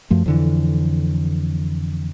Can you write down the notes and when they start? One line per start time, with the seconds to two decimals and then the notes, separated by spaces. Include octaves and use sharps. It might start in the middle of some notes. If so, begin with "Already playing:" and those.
0.10 F#2 F3 A3
0.26 F2 D3 E3